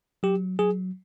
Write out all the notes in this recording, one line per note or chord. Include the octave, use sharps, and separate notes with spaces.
F#3 G4
F#3 G#4